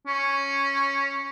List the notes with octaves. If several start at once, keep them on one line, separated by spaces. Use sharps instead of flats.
C#4